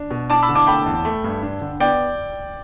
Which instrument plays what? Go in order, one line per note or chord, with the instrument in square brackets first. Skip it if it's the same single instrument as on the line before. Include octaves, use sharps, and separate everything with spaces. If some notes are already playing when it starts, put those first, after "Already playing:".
Already playing: [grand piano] D4
B2
[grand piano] D4 [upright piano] A5 D6
[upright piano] B5 E6
[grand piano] D3
[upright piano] A5 D6
[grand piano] A3 [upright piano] G5 B5
[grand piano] E2
A3
G2
D4
D3
[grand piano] B3 [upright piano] D5 G5